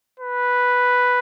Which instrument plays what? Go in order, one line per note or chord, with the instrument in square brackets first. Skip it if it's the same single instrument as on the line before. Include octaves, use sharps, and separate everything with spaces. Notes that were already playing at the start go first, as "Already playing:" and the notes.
[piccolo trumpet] B4